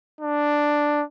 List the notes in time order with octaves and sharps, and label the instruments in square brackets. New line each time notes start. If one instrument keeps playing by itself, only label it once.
[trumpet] D4